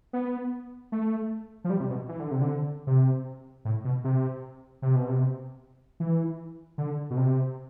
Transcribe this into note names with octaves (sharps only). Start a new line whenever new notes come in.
B3
A3
F3
G3
C3
B2
E3
D3
C3
D3
C3
A2
B2
C3
C3
B2
C3
E3
D3
B2
C3